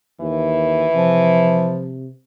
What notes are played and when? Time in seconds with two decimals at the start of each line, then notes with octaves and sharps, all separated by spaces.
0.21 D#2 E3
0.95 C3 F3